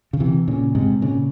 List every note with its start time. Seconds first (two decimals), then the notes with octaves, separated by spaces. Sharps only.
0.13 C#3
0.20 C3 E3
0.48 A#2 C#3
0.75 G#2 C3
1.02 A#2 C#3